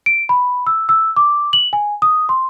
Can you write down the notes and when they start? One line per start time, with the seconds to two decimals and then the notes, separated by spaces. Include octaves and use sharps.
0.06 D7
0.29 B5
0.67 E6
0.89 E6
1.16 D6
1.53 F#7
1.73 G#5
2.02 D#6
2.29 C6